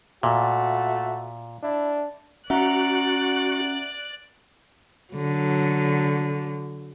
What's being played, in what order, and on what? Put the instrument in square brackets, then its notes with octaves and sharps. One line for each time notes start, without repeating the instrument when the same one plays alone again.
[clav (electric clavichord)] A#2 [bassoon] A3 [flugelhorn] F#4
[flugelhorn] D4 [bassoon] E4
[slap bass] C#4 [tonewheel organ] F#4 [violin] D5 F#6 [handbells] E5 F#5 A#5
[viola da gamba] D3 F#3